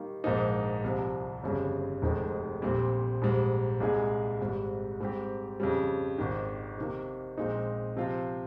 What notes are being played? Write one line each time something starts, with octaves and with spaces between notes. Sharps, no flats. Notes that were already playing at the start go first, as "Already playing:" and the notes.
Already playing: D#3 G3 A#3
A#1 G#2 F3 A#3 D#4
C2 C3 F3
G1 F2 C#3 G3
F1 F2 D#3 G#3 C4
A#1 A#2 G3 C4
A#1 G#2 G3
C2 A#2 G#3 D#4 G#4
G#1 G#2 G3
G#2 G3 C4 G4
F2 C#3 G3
G#1 G#2 D#3
C3 D#3 A#3
A#1 A#2 G#3 C4 D#4
C3 F3 C4 F4